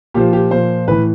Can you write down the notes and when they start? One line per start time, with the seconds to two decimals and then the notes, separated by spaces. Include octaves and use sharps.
0.14 A#2 F3 G4
0.33 G4
0.51 A#2 F3 C5
0.88 A2 E3 B4